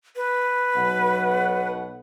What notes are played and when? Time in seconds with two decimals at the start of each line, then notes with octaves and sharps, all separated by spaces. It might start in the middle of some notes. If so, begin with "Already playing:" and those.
0.16 B4
0.76 B1 B2 F#5